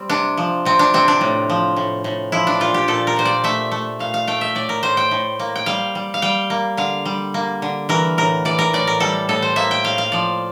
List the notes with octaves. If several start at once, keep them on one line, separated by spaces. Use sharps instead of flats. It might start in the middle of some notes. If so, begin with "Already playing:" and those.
Already playing: G3 C4
C3 D4
F3
C3 C4
D4
C3 C4
D4
A2
F3
A2
A2
F3 E4
D4
A#2 F4
G4
A#2 A4
A#4
A#2 C5
D5
A3 E5
A3
A#2 F5
F5
A3 G5
E5
A2 D5
A#4
A2 C5
G5
A2
A#3
G5
G3 F5
G3
F5
G3 G5
A#3
D3 F5
G3
A#3
D3
E3 A#4
A2 A#4
E3 D5
A#4
A2 D5
A#4
G3 A4
A2 A4
C5
A#3 E5
G5
A2 F5
F5
F3 D5